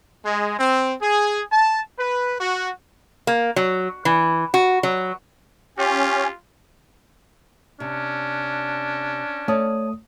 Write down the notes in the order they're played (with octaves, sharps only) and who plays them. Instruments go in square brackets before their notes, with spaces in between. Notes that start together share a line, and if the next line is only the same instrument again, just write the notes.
[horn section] G#3
C4
G#4
A5
B4
F#4
[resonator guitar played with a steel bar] A#3
F#3
E3
F#4
F#3
[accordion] C#4 [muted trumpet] F4 [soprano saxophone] G4
[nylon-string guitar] C3 [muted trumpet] C#4 [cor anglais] D4
[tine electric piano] A3 D#6 [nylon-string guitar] C#5 D5 A5